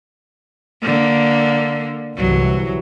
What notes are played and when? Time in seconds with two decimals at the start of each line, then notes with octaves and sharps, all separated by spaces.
0.83 D3 A#3
2.17 G1 C2 E3 F#3